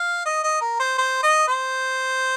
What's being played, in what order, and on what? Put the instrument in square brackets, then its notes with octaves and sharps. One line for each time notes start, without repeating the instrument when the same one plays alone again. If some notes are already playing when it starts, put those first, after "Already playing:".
Already playing: [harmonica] F5
D#5
D#5
A#4
C5
C5
D#5
C5